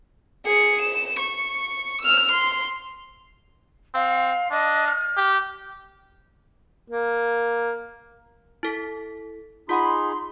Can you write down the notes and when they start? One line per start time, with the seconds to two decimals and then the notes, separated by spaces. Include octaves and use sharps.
0.45 G#4 C#7
0.82 E7
1.20 C#6
2.02 E6 F6
2.32 C6
3.94 C4 F5
4.51 D4 D#5
4.86 F6
5.17 G4
6.90 A#3
8.63 E4 A4 B6
9.69 D#4 F4 G#4 F#5 B5 C6 D#6